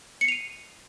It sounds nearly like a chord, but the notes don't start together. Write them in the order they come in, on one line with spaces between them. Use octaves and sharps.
C#7 C7 F7 D#7